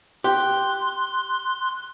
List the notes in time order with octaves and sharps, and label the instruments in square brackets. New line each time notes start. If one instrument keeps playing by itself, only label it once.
[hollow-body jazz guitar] G4 [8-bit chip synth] C6 F#6